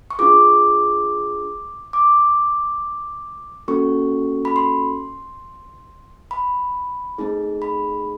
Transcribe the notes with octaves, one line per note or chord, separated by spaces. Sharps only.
C#6
D4 F4 G#4 D6
D6
A#3 C#4 F#4 A4 C#6
B5
C6
B5
A3 C4 D#4 G#4
B5